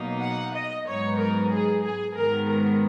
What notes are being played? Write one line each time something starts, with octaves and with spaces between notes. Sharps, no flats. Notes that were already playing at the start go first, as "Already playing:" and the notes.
Already playing: B2 F#3 A#3 D#4
F#5
D#5
G#2 F#3 B3 D#4 C#5
A#4
G#4
G#4
G#2 D#3 G#3 B3 A#4
A#4